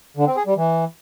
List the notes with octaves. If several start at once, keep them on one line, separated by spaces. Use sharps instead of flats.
D3
C4
G#4
G3
E3